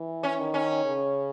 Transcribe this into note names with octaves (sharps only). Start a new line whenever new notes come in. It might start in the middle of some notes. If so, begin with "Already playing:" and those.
Already playing: E3
C#4
D#3
C#4
C#3